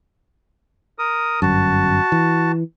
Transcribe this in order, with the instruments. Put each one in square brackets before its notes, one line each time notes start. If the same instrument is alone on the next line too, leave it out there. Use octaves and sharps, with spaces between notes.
[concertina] A#4 D#6
[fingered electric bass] G1 F#2 [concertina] F#4 A5
[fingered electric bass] E3